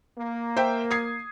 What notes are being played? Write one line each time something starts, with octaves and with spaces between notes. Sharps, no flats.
A#3
C5 E5 G5
D#6 G#6 C7